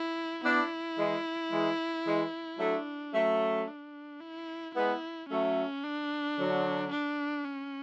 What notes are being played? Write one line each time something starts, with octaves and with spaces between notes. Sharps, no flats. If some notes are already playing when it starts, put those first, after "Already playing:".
Already playing: E4
B3 D4 E4
E3 G#3
E3 G#3
E3 G#3
F#3 A3 D4
F#3 A3 C#4
D4
E4
G#3 B3 E4
F#3 A3 C#4
D4
D3 F#3
D4
C#4